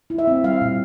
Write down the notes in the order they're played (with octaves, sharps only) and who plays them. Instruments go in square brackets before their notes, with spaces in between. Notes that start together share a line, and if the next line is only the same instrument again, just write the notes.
[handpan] E4
E5
C4
G3 F5
A#2